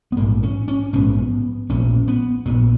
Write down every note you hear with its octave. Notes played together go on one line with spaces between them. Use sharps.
B3
A#1 G#2 A#3
C#4
C#4
A#1 G#2 B3
A#1 A#2 C#4
B3
A#1 A#2 B3